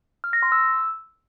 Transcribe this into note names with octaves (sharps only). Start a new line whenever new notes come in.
F6
A#6
C6
E6